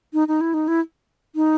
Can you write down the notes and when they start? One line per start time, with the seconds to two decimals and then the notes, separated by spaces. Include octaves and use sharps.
0.13 D#4
0.28 D#4
0.41 E4
0.54 D#4
0.68 E4
1.35 D#4